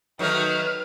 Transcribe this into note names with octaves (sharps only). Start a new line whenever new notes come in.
D#3 F#3 A3 B4 F6